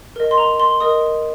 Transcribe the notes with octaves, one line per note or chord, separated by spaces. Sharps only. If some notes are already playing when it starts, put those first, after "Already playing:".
A#4 D#5
C6
A#5
C6
A#4 D#5 D#6